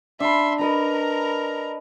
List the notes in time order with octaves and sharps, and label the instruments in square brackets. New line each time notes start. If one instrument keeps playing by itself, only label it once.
[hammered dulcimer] D4 B5 [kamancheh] E5 C6
[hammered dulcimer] D4 B4 D#5 [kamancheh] A#4 A#5